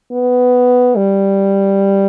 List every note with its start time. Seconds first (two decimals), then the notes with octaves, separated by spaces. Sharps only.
0.12 B3
0.96 G3